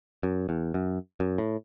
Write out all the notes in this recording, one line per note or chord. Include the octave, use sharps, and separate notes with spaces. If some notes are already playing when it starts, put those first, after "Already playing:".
F#2
E2
F#2
F#2
A2